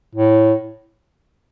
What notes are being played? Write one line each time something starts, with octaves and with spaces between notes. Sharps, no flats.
A2